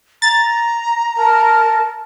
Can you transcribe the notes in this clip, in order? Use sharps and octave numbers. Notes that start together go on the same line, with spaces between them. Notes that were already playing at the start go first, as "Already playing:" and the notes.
A#5 A6
A#4 A5